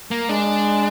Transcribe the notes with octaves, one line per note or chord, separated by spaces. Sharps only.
A#3
G#3 D4